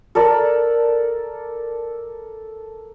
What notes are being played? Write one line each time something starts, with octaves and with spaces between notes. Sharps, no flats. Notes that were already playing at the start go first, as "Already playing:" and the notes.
A4 A#4 D5